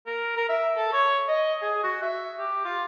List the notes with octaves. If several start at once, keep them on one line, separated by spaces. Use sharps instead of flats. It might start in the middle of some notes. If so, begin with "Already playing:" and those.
A#4
A#4
E5
A4
C#5
D#5
G#4
F#4
E5
G4
F4